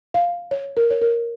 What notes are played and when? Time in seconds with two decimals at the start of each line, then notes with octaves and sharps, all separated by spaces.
0.14 F5
0.51 C#5
0.77 A#4
0.90 C#5
1.01 A#4